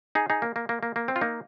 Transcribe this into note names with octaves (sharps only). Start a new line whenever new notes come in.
D#4 G#4
D#4 G#4
A#3
A#3
A#3
A#3
A#3
C4
F4
A#3 D#4